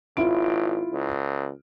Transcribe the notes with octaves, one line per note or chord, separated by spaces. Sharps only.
G#1 E4 F4 D7
C#2